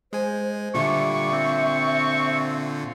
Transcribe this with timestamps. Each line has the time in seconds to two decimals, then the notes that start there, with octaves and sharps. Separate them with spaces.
0.13 G#3 C5 G#5
0.75 A#2 D3 G3 F4 E5 C#6 D6
1.32 C4